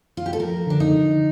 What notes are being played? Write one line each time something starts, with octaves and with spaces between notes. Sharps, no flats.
F4
G4
A4
F3 A#4
D3 D4
D#4
D3